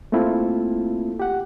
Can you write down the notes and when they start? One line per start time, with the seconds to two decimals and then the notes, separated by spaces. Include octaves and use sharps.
0.12 A3 A#3 C4 E4 F4 A4
1.20 G4 F#5